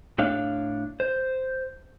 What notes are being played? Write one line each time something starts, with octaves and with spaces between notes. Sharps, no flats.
A2 A3 D4 C#5 F5
C5